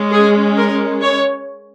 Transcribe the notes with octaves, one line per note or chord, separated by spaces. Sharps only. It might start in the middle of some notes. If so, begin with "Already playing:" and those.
Already playing: G#3 C#4
G#4
A#4
C#5